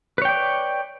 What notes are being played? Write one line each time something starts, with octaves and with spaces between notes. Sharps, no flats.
B4 C#5 D5 G5